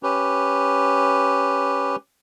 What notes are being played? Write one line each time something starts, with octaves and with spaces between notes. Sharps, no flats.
C#4 G4 B4